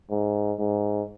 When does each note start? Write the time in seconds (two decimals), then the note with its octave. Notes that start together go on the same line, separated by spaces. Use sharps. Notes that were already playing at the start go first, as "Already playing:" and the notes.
0.10 G#2
0.59 G#2